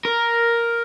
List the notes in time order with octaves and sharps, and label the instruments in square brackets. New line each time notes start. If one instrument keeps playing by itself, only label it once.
[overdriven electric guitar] A#4